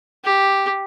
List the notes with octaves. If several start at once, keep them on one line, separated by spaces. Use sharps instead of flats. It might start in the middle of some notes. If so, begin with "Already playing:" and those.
G4